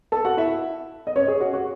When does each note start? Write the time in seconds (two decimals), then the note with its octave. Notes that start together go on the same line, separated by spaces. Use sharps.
0.12 A4 A5
0.25 F#4 F#5
0.37 E4 E5
1.07 D#5
1.16 C#4 C#5
1.28 G#4
1.41 F#4
1.54 F#4